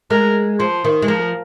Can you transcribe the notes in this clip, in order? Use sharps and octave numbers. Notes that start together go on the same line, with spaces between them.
G#3 A#4
F3 C5
D#3
G#3
F3 A#4